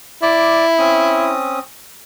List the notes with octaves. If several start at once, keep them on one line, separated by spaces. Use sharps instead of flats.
E4 D5 D6
C4 C#4 D#6